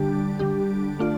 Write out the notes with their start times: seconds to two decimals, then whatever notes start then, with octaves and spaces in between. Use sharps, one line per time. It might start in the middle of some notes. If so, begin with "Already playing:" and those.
Already playing: D3 G3 D4 G4
0.39 D3 G3 D4 G4
0.99 A3 D4 F4 D5